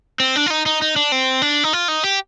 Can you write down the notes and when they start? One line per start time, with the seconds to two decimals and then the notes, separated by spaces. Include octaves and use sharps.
0.20 C4
0.36 D4
0.46 F4
0.50 D#4
0.66 D#4
0.82 D#4
0.96 D4
1.12 C4
1.42 D4
1.64 D#4
1.73 F4
1.88 D#4
2.03 G4